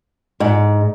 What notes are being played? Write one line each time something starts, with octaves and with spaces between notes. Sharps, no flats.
G#2